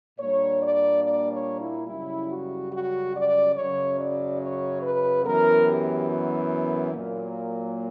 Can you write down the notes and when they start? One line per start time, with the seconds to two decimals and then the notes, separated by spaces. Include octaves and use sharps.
0.19 A#2 G3 A#3 D4 C#5
0.61 D5
1.04 D5
1.32 C#5
1.60 E4
1.87 F#2 C#3 G3 E4
2.30 F#4
2.72 F#4
3.15 D5
3.56 F#2 C#3 F#3 C#5
3.98 D5
4.41 C#5
4.82 B4
5.25 F#2 E3 B3 A#4
5.66 G4
6.08 F#4
6.65 A#4
6.93 A#2 F#3 A#3